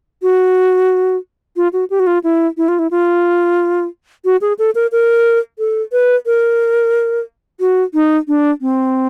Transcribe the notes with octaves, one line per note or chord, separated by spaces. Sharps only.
F#4
F4
F#4
G4
F#4
F4
E4
E4
F4
E4
F4
F#4
G#4
A4
A#4
A#4
A4
B4
A#4
F#4
D#4
D4
C4